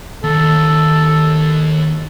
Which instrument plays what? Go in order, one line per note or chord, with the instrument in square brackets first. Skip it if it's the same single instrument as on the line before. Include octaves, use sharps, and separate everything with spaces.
[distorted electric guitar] D#2 [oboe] A4